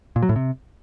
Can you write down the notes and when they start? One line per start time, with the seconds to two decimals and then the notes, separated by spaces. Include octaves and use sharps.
0.16 A#2
0.23 F#3
0.29 A2
0.36 C3